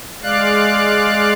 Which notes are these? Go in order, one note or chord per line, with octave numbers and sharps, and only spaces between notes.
G#3 D5 F5 F#6